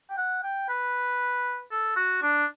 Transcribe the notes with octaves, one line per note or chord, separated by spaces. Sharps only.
G5
F#5
G5
B4
A4
F#4
D4